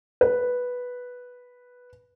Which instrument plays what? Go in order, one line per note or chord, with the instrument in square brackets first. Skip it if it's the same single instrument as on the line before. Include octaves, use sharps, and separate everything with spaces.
[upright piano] B4